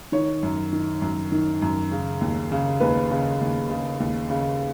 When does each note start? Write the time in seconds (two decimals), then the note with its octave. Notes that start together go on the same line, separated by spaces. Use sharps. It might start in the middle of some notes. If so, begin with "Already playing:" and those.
0.12 D#3 C#5
0.43 F#2
0.72 D#3
1.02 F#2
1.32 D#3
1.62 F#2
1.91 C#3
2.21 D#2
2.52 C#3
2.80 D#2 B4
3.11 C#3
3.41 D#2
3.70 C#3
4.00 D#2
4.30 C#3